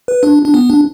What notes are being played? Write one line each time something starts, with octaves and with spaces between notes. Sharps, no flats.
B4
D4
D4
B3
D4